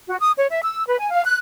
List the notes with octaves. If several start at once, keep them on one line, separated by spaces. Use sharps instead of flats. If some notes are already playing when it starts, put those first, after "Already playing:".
F#4
D#6
C#5
E5
E6
B4
G#5
F5
F#6